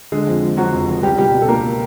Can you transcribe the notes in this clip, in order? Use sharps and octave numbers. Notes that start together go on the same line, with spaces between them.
D3 G#3 G#4
F2
F3
F3 F#3 F#4
F1
F1
C#2 G3 G4
B2 G3 G4
B2
A4
C#2 A#3 A#4